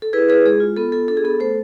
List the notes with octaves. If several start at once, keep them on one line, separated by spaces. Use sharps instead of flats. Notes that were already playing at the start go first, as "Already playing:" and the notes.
A4
E4 G#4 B4
E4 G#4 B4
G#3 G#4
F4
B3 A4
F4 A4
D4 A4
G#4
B3 A4
A3 A4 C5